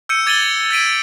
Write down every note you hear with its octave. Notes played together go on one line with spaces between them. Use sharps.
E6 G6 C#7 D#7
D6 G#6 A6 D#7 F#7 G7
G#6 B6 D7 D#7